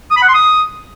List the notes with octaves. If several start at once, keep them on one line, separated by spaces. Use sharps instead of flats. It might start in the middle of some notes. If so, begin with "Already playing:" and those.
D#6
B5
F#5
C6
D#6